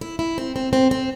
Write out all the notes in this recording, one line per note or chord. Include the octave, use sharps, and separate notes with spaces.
E4
E4
C4
C4
C4
C4